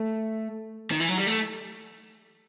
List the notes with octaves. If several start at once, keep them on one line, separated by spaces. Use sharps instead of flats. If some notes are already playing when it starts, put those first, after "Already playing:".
Already playing: A3
D#3
E3
F#3
G3
A3